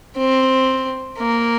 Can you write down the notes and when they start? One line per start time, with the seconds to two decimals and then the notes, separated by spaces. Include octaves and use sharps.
0.18 C4
1.19 A#3